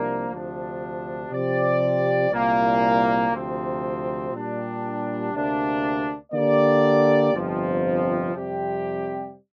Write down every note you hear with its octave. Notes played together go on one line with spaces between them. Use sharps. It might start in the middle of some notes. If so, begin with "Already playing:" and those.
Already playing: C2 C3 F3 A#3 D4
D2 C3 F3 D4
C3 F3 C4 G4 D5
C2 A#2 A#3
D2 C3 F3 C4
A#2 G3 D4
D2 C3 A#3 D4
D3 A#3 G4 D5
G1 F2 C3 F3 C4
F2 C3 G3 C4 G4